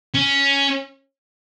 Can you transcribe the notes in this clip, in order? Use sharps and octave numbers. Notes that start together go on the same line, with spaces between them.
C#4